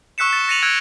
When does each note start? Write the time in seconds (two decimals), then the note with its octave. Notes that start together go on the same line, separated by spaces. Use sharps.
0.18 C#6 E6 F#6 B6 C#7 E7
0.33 A6
0.48 A6 A#6 C#7 D#7 F7 F#7
0.62 E6 F#6 G#6 A#6 D7